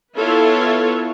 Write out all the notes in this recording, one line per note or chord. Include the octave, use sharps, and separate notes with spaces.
B3 E4 F4 A4 B4 C#5